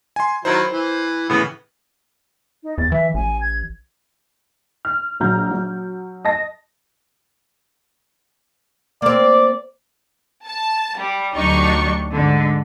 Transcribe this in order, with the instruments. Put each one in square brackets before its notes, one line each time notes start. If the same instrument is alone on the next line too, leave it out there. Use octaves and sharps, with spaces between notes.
[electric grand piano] G#5 C6
[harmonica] D#3 F#3 E4 [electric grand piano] C5
[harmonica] E3
[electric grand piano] A2 C#3 E3 [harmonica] B3
[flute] D#4
[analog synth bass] E2 [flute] A6
[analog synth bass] E3 [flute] E5
[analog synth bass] A1 [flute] G#5
[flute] G#6
[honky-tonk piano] F6
A#1 A#2 F#3 A#5 F6 G6
F#3
D#5 A5 A#6
[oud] A#3 C4 [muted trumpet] D5
[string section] A5
G3
D2 F#3 G3 D4 D#4 C#6
G#2 D3